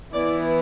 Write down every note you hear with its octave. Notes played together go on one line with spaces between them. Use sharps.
E3 B3 E4 D5